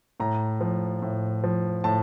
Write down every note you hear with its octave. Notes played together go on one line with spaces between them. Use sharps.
A2 A#5
F3
A2
F3
A2 A5